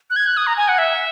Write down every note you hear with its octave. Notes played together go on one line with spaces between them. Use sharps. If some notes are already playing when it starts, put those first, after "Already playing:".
F#6
G#6
F#6
D#6
A#5
G#5
F#5
E5